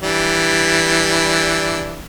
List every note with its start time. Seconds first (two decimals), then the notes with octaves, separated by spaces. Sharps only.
0.02 E3 G3 D4